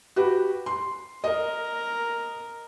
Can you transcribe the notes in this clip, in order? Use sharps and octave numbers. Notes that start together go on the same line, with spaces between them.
F#4 G4 B4
C6
A#4 D#5